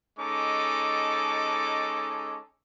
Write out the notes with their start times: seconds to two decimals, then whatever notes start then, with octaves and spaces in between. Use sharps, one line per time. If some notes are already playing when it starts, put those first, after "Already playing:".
0.19 G#3 C#4 D#4 A4 D6